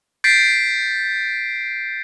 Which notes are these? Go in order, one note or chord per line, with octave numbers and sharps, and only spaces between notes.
G6 A6 B6 C7 D7